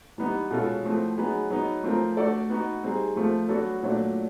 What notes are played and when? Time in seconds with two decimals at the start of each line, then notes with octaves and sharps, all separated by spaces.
0.18 E3 G3 B3 D#4
0.51 B2 G#3 C#4 F4 A4
0.83 F3 A3 C4 E4
1.17 F#3 B3 D#4 G#4 B4
1.50 F#3 B3 D#4
1.84 F3 A3 C4 F4 A#4
2.17 A3 D4 F#4 A4 D5
2.50 B3 D#4 F#4
2.83 G3 C4 D#4 G#4
3.16 F3 A3 C4 F4
3.48 F#3 B3 D4 F#4 A4
3.82 A#2 F#3 A3 D4